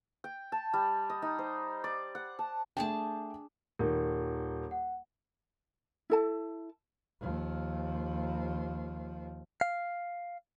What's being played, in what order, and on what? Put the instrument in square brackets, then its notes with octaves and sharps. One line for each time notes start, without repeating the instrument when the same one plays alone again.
[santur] G5
A5
G3
D#5
D#4
C5
D5
F#5
A5
[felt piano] A3 G5 [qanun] D4 G#4 A5
[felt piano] D#1 D#3 [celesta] A#4
[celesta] F#5
[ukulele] E4 A4 A5
[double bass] D#2 F3
[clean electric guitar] F5